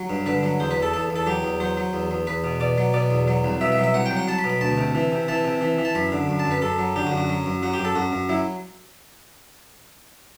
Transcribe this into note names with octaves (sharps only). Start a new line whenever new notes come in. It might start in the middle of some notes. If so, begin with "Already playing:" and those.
Already playing: F#3
G2
D3 B4
F#3
E2 C5
B4
E2
A4
E2 A4
E2
A4
F#3 G4
E2
F#3 C5
F#3
E2
E2
E2 B4
B2
B2 D5
F#3
B2 D5
E2
F#3
C2
B2 E5
E5
F#3
E5
C2 F#5
G5
F#3
F#5
F#3 A5
B5
B2
B5
D2 A5
C3
E3
C3
E3 A5
C3
E3
E3
A5
F#2 B5
D3
F#2
A5
F#2
B4
F#2 A4
F#3
D3 G4
F#4
F#2
F#4
F#3
F#2
F#3 F#4
G4
F#2
A4
F#2 F#4
F#2
F#3 E4